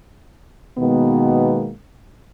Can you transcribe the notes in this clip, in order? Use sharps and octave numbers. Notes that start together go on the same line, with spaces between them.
B2 D#3 G#3 A#3 B3